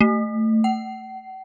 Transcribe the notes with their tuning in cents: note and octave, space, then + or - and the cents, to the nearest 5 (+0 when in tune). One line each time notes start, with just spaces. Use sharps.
A3 +15
F#5 +45